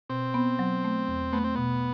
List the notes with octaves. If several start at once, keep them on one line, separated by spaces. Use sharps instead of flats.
B2 C4
B3
F#3
A3
E2
A3 B3
C4
B2 B3